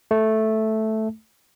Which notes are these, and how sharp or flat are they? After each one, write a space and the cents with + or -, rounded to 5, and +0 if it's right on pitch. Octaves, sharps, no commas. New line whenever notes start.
A3 -5